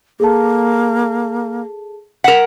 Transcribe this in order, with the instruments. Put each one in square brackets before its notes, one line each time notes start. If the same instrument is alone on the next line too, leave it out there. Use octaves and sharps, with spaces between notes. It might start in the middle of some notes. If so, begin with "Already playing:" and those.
[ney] A#3 [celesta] G#4 A4 A5
[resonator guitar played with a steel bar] A#4 F#5 [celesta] B6 E7